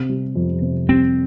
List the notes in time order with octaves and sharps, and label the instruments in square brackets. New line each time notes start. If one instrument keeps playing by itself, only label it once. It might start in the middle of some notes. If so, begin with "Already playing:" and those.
Already playing: [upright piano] C3 [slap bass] C4
[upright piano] G3
F2
C3
[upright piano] G3 [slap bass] C4